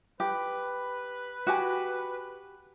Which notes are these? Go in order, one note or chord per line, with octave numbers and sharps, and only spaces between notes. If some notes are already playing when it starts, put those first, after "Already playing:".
G4 B4
F#4 G4 G#5